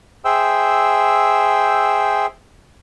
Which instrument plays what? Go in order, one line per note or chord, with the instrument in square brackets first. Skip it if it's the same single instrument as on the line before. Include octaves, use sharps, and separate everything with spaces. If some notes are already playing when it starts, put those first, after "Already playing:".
[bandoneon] G#4 C5 E5 G5 E6